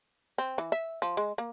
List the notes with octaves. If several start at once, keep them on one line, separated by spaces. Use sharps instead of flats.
C4
E3
E5
F3
G#3
A#3